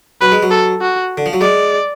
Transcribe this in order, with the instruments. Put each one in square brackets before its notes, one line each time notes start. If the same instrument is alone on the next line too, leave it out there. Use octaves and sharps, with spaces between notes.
[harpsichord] F#3 [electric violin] B4
[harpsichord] G#3
F#3
[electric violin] A4
F#4
[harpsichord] D3
F3
F#3
[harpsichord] G#3 [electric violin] D5